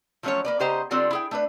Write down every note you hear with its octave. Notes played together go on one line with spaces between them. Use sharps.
F3 F#3 A3 C#4 F4 C#5
A#3 B4 D5
C#3 B3 G4 C5 D#5 A#5
D3 G3 C4 D4 F4 A4
E4 G#4 G5
A3 D4 B4